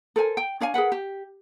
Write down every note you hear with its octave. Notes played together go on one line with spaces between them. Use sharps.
A4 A#4 C5 G#5
G5
D4 C#5 F5 G#5
G#4 A#4 B4 F#5
G4